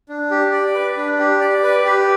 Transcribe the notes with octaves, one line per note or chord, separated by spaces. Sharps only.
D4
G4
D5
B4
D4
G4
D5
B4
G4